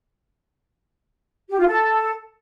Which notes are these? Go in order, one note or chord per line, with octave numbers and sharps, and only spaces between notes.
G4
F4
A4